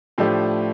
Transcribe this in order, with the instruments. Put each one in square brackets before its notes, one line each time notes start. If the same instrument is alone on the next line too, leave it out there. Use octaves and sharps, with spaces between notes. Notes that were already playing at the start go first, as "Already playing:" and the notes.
[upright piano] A2 F3 A3 D4 G4